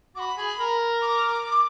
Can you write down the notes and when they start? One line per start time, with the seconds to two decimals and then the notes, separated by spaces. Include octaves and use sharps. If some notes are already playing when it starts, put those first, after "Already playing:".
0.15 F#4 B5 D6
0.37 G#4
0.59 A#4
1.02 D6